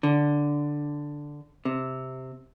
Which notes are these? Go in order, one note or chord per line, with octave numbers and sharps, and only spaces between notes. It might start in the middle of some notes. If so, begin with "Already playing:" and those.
D3
C3